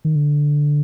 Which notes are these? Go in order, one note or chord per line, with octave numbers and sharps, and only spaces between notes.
D#3
D3